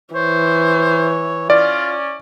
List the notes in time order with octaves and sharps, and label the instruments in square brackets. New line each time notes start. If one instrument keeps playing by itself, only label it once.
[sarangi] E3 [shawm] C5 [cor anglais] C#5
[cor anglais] C#4 [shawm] F4 [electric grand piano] D5